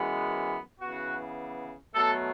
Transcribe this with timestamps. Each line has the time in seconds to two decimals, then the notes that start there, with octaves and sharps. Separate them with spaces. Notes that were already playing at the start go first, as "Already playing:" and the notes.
Already playing: F#2 E3 G#3 B3
0.81 C#3 E3 B3 F#4
1.95 B2 F#3 A3 A4